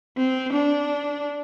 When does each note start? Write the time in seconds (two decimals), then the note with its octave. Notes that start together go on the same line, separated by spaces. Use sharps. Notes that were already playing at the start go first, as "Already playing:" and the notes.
0.18 C4
0.53 D4